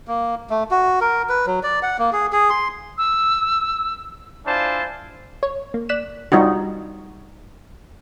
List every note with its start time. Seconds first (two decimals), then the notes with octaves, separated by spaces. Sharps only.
0.08 A#3
0.50 A3
0.71 F#4
1.01 A#4
1.29 B4
1.46 F#3
1.63 D5
1.83 F#5
1.99 A#3
2.13 G#4
2.32 G#4
2.50 C6
2.98 E6
4.46 D4 E4 F4 C5 G#5 A5
5.43 C#5
5.74 A#3
5.89 D5 F#6 B6 E7
6.32 G3 D#4 F4 F#4